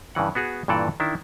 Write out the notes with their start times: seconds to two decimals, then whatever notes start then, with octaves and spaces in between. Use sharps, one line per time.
0.15 G2 C#3 E3 F#5
0.35 B3 F#4 G#4
0.68 G2 A#2 E3 A4 D5
1.00 D#3 D4 E4